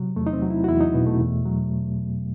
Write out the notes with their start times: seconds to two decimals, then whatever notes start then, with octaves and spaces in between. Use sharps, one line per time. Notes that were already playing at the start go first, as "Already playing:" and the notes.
Already playing: C3 F#3
0.16 E2 A3
0.27 D#4
0.33 C4
0.42 F#3
0.50 E4
0.64 F#4
0.68 E2 E4
0.80 D#4
0.94 B2 B3
1.07 A3
1.20 E2
1.45 F#3